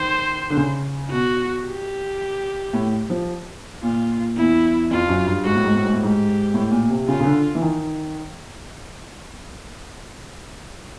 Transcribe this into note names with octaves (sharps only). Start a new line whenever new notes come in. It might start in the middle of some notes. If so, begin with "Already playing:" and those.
Already playing: D#3 C5
D3
C#3
B2 F#4
G4
A2
F3
A#2 F4
E2 E4
F2 F4
F#2
G2
G#2 F#4
A2
G#2
A2
G#2
A2
G#2 G4
A2
A#2
C3
C#3 F4
C#3
D3
E3
D#3